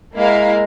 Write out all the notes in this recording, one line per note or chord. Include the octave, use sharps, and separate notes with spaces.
G#3 A#3 E4 A#4 F5